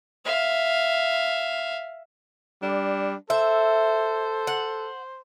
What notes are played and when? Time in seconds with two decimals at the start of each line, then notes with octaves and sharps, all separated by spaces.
0.25 E5 F5
2.63 G3 D4
3.30 A4 C5 E5
4.47 F#5